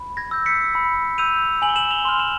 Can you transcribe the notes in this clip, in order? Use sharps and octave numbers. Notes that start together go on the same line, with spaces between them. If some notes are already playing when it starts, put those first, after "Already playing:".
Already playing: B5
G#6 A#6
E6 G6
B6 C#7
B5
E6 G6 D#7 F7
G#5 F#7
G7
E7 F#7
F7 G7
C6 F6
E7 F#7